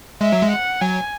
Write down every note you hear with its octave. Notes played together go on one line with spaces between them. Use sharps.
G#3 E5
F#3
G#3
F#5
F#3 G#5